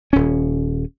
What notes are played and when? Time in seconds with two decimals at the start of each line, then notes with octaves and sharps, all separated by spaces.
0.13 D#1 C#4